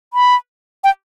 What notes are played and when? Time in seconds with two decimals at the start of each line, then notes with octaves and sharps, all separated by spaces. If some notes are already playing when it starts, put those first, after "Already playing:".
0.14 B5
0.84 G5